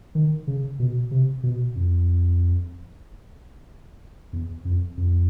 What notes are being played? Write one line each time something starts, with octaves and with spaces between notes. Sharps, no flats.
D#3
C#3
B2
C3
B2
F2
E2
F2
F2